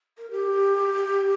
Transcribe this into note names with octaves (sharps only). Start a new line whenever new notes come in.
A#4
G4